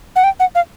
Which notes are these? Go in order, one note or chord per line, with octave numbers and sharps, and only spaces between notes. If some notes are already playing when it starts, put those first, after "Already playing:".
F#5
G5
F#5
F5